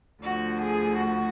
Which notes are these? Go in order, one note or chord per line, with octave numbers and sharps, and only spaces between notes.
D2 D3 F3 F#4
G#4
F#4